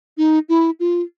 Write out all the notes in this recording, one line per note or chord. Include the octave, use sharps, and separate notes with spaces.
D#4
E4
F4